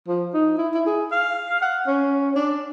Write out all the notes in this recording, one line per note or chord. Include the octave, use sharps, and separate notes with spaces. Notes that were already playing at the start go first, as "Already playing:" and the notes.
F3
D#4
E4
E4
G#4
F5
F#5
C#4
D4